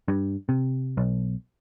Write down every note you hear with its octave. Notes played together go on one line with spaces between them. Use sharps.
G2
C3
B1